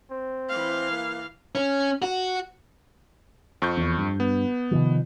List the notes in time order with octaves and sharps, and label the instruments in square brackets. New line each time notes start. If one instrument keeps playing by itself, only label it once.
[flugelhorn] C4
[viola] E3 F5
[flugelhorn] A#3
[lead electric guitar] C#4
F#4
[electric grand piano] F2 C#6 G6
[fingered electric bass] E2
G2
[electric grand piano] B3
[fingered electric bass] C3 D#3 F3